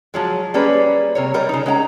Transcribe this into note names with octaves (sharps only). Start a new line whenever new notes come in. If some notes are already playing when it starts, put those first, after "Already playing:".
F3 F#3 G#3
G3 A#3 C#4 G#4 B4
C3 A#4 C#5
G3 A#4 C#5 D#5
C#3 D#4
G#3 C#4 F#5 A#5